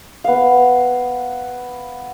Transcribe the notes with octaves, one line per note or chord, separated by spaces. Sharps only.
B3 F5